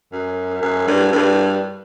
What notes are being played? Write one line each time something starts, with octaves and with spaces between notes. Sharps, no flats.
F#2
F#2
G2
G2